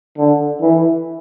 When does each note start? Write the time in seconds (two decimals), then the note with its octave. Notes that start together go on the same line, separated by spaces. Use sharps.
0.18 D3
0.61 E3